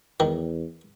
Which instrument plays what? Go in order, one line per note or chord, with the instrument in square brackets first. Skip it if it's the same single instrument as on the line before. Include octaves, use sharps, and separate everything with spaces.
[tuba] E2 [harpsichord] D#3